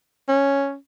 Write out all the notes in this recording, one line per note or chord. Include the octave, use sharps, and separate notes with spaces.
C#4